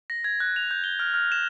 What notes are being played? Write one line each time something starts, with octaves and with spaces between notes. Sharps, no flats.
A#6
G#6
F#6
F7
G6
G7
F6
F6
E7